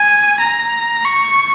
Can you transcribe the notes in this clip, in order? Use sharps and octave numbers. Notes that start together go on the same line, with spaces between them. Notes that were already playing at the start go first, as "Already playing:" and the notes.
Already playing: G#5
A#5
C#6